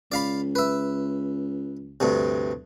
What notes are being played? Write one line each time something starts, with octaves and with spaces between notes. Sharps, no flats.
C#2 D5 F5 B5
B4 E5
D2 G2 C3